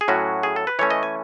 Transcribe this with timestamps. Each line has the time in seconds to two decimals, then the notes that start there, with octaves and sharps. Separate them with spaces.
0.01 G#4
0.08 A2 F#3 C#4 F#4
0.43 G#4
0.56 A4
0.67 B4
0.79 E3 A3 C#4 C#5
0.90 D#5
1.03 G#5